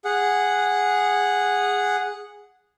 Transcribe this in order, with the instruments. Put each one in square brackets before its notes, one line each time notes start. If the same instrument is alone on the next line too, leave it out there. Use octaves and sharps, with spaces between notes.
[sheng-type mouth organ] G#4 F#5